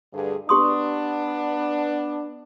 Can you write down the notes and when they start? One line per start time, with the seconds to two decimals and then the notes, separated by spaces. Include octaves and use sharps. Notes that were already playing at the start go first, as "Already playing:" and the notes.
0.12 D2 G2 G#4
0.49 B3 D4 G4 C6 D#6